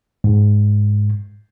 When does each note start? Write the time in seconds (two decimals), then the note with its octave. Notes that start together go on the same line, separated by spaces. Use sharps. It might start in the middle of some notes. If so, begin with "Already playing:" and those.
0.24 G#2